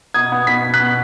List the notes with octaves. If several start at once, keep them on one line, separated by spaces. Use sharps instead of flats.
B2 D#6 G#6
B3
B2 B6
B3
F#6 B6
B2